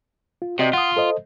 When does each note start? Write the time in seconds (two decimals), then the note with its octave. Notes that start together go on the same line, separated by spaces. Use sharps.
0.42 F4
0.59 C3 F#4 D5 D#5
0.73 F4 F#5 D#6
0.97 A4 C5 D#5